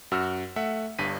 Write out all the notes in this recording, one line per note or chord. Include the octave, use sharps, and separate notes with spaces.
F#2 F#4 E6 F6
A3 E5 F#5
G1 G2 B6 D#7